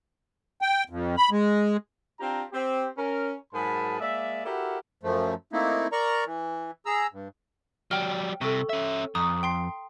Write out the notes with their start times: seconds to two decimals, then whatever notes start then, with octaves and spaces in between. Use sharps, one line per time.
0.62 G5
0.90 F2
1.17 B5
1.31 G#3
2.20 C4 D4 F4 G4 A#5
2.53 C4 G4
2.98 C#4 A#4
3.54 G#2 F#3 G#4 A#4 A5 B5
4.00 G#3 A#3 D5 E5
4.45 E4 F#4 G4 A4 A#4
5.03 F#2 F3 A3
5.53 A3 A#3 C4 D#4 E4
5.92 A#4 D5 A#5 C#6
6.25 E3
6.86 G#4 A#5 E6
7.13 G2
7.91 F#3 G3 G5 F6
8.41 C2 C3 A4 C#6
8.69 C#4 E5
9.15 F2 A#5 D#6
9.43 G5 C6 C7